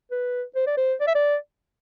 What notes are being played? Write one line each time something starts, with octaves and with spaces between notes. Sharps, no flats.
B4
C5
D5
C5
D5
E5
D5